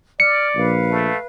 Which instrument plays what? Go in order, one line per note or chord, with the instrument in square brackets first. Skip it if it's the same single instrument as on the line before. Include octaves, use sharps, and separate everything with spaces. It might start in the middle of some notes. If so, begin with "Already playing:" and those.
[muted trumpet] D5 [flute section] F6 [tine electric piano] C#7
[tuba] A#1 [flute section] B4 F5
[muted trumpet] A3